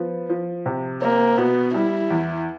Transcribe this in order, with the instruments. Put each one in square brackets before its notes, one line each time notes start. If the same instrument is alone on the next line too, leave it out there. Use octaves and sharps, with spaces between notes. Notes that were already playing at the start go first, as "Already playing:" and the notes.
Already playing: [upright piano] F3 B3
F3
C3
[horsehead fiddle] A#3 [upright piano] C4
[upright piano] B2 [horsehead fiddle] B3
[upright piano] G3 [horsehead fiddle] E4
[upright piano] E2